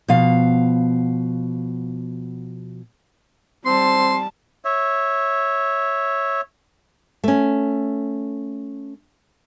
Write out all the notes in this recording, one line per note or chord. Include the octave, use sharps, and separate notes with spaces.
B2 F3 F5
G3 C4 A5 C6
C#5 E5
A3 C#4